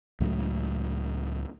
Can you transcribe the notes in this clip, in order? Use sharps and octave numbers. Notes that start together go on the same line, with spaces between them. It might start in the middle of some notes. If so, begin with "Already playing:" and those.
C#2 A2 F#3 A3